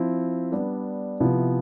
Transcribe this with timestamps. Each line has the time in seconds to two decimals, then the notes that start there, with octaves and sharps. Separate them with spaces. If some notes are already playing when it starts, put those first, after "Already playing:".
Already playing: F3 C4 E4
0.52 G3 B3 D4
1.20 C3 F3 B3 E4